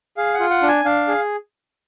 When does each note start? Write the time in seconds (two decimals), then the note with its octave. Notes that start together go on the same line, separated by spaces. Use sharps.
0.17 G#4 F5
0.34 F#5
0.40 F4
0.50 F#5
0.63 D4
0.68 G#5
0.85 D4 F5
1.08 G#4